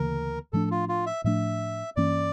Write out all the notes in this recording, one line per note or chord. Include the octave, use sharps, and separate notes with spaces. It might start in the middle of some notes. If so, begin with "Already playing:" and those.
Already playing: D2 C#3 E3 A#3 A#4
A2 F3 A3 D4 A4
F4
F4
E5
A2 F3 A3 D4 E5
G2 E3 A#3 C#4 D5